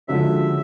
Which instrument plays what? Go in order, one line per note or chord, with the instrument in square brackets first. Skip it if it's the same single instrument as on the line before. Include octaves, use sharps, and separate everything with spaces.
[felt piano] D3 F3 G#3 C#4 F#4 [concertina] E5